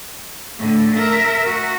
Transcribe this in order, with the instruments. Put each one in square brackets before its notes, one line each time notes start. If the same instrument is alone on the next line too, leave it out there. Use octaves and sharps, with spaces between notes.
[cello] A2 D3
A#4 E5
F#4